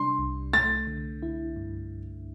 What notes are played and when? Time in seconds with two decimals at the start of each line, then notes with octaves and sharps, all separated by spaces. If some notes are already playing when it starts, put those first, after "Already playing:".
Already playing: C3 G3 D4 C6
0.19 C2
0.53 A3 A6
0.87 D3
1.22 E4
1.56 G2